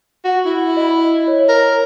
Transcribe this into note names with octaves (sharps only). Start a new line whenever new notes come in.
F#4
E4
D#5 B5
C#5
A#4